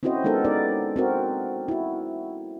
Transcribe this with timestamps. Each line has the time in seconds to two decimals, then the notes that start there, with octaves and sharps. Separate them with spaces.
0.03 C4 C#4 E4 F#4 C5 D#5
0.24 G#3 B3 D#4 A4 A#4
0.44 B3 D#4 A#4 D5
0.96 C4 F#4 A#4
1.68 E4 F#4